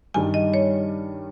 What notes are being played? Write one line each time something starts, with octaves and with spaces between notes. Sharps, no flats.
G2 D#3 G3 G#5
D#5
C#5